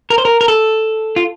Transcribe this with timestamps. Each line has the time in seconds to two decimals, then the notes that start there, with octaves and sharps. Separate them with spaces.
0.10 A#4
0.18 C5
0.25 A#4
0.41 A#4
0.48 A4
1.16 F4